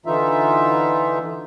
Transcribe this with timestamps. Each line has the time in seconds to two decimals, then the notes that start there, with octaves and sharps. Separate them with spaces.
0.06 D3 E3 D#4 F4 E5